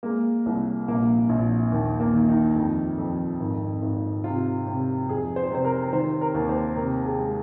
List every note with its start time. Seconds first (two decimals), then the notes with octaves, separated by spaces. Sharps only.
0.03 G#3 A#3
0.46 C2
0.88 A#1 A#3
1.29 A#1
1.72 D#2
2.00 A#3
2.13 D#3
2.29 D#4
2.56 F2
2.98 F2
3.40 G#1
3.82 G#1
4.24 C3 F4
4.67 C3
5.09 F2 G#4
5.36 C5
5.50 C3 C5
5.65 A#4
5.93 D#3 C5
6.21 A#4
6.34 D#2
6.49 C5
6.76 C3 A#4
7.05 G#4
7.19 G#3